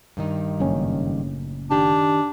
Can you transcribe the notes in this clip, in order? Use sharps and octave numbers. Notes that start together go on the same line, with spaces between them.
G2 D#3 D#4
F#1 A2 C#4
D#3 D4 G4 A5